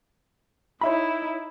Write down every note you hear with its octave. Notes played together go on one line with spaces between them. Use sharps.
D#4 E4 C#5 E5 B5